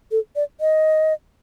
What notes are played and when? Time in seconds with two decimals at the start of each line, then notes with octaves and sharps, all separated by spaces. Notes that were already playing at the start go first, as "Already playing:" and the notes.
0.11 A4
0.36 D5
0.61 D#5